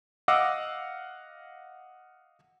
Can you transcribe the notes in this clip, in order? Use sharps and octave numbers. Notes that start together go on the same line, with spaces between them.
D#5 F5 F#5 D6 E6